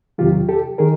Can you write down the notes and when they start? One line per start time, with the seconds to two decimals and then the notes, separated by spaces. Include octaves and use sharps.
0.18 E2 C3 D#3 F#3 F4 G4
0.49 G4 A4
0.78 D#3 G#4 A#4